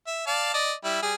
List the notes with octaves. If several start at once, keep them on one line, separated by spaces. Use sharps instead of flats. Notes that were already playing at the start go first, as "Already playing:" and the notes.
E5
D5 F5 A5
D5 D#5
G3 E4
G3 G#4